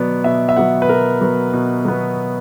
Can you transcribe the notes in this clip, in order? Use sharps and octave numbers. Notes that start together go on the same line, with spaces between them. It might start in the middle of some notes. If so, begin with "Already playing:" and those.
Already playing: B2 F#3 B3 D5
B2 E5
E5
F#3 B3 F#5
B4
B2 A#4
F#3 B3
B2
F#3 B3